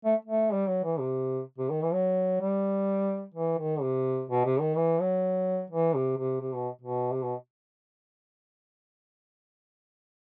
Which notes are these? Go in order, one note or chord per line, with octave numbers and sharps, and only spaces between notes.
A3
A3
G3
F#3
E3
C3
C3
D#3
E3
F#3
G3
E3
D#3
C3
B2
C3
D#3
E3
F#3
E3
C3
C3
C3
B2
B2
C3
B2